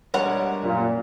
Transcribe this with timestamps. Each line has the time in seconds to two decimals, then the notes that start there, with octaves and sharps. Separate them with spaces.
0.14 G3 G#3 D4 A#4 C#5 F#5
0.63 F#2 A#2